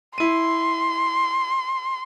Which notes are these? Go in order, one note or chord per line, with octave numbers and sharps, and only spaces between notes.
E4 C6 D#7